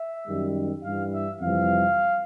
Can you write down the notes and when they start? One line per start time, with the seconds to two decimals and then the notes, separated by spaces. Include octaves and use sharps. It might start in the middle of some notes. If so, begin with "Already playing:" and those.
Already playing: E5
0.28 F#2 D#3 G3
0.84 G2 E3 G3 F5
1.13 E5
1.40 F2 C3 E3 G3 F5